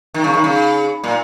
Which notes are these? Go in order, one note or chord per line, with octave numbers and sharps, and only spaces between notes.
D#3
C#3
D#3
C#3
A#2